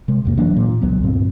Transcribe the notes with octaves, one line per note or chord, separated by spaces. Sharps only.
C3 G#3
D1 F2 A#3
E3 F#3 A#3 D4
A#2
C#2 F#3 B3
D2 G2 A#2 C4